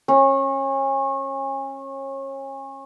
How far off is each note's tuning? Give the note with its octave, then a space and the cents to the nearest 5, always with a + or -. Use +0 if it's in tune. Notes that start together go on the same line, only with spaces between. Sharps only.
C#4 -30